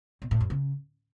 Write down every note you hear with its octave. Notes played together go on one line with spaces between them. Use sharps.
B2
A2
F#2
C#3